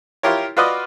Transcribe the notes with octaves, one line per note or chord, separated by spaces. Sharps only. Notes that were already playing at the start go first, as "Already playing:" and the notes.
E4 F4 G4 A#4 C#5
F4 F#4 B4 D5 D#5 D6